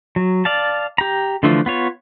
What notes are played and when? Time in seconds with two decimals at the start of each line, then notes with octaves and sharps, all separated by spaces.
0.16 F#3
0.45 D5 F5 A5
0.98 G4 A#5
1.43 D3 E3 F3 A3 F4
1.66 B3 F4 C#5